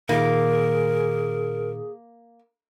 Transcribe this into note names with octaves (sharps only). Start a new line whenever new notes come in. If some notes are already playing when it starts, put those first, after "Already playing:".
A#2 D#3 A#3 G#4 A#4